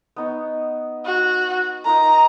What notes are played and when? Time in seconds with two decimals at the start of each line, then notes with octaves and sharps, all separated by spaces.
0.16 B3 D#4 C#5
1.06 F#4
1.85 D#4 F4 A#4 A#5